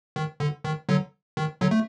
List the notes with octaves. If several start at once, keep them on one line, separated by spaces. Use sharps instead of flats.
D#3
D3
D#3
D3 F#3
D#3
D3 F#3
A3